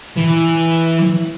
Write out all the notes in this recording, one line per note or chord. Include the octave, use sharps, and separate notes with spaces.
E3